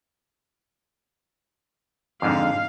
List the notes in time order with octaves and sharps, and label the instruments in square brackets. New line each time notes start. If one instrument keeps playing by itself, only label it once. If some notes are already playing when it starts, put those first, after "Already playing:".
[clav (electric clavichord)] F2 G#2 D3 [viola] F5